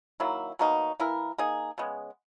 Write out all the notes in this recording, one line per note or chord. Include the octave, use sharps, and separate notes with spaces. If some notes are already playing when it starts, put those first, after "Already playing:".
D#3 F#3 A#3 E4
B2 F#3 A#3 D#4
E3 A#3 E4 A#4
A#3 D#4 G#4
C#3 G#3 B3